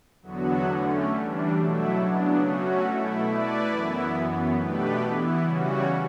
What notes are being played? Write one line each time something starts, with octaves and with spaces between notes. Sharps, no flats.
E2 D3 F#3 B3 F#4
D3 A3 C#4
E3 G3 D4
B2 F#3 A3 E4
C#3 F#3 B3 D4
F#3 A3 C#4 F#4
B2 A3 E4
A3 E4 B4 D5
F#2 E3 B3 E4
F#2 E3 B3
B2 A3 D4 G4 B4
E3 B3 E4
C#3 E3 G3 C#4 F#4